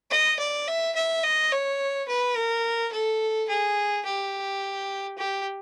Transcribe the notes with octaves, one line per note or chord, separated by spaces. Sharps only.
D#5
D5
E5
E5
D#5
C#5
B4
A#4
A4
G#4
G4
G4